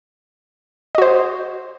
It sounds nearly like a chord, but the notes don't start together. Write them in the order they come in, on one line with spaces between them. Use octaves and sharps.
D#5 F#4 C5